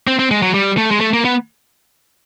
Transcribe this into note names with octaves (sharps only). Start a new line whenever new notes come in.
C4
C4
G#3
F#3
G3
A3
G#3
A3
A#3
B3